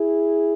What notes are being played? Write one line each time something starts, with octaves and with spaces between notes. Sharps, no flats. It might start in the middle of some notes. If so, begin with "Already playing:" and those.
Already playing: E4 G#4